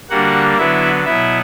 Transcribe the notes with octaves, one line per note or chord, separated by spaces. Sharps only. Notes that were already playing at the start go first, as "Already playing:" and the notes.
D3 G3 A#3 F#4 F#5
D3 F#3 B3 E4 E5
B2 F#3 B3 E4 E5